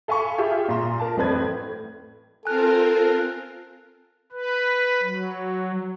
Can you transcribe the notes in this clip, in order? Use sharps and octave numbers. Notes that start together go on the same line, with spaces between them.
A4 F5 G#5 B5 C#6
F4 G4 G#4 E5
A#2 F4 A#5 C6
A#4 A5
A1 F2 C4 B4 D5 G#6
A2
C4 F4 A4 A#4 G#5 F#6
B4
F#3